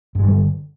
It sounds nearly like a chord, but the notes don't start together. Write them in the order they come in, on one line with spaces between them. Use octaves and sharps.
G2 G#3 G3 D3